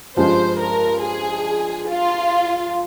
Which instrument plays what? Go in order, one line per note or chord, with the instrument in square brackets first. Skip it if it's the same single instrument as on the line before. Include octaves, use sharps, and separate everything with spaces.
[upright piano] G2 F3 G#3 [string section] C5
[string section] A#4
G#4
F4